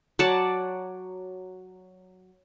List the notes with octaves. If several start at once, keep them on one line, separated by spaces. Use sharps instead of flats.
F#3 D5 F#5 A5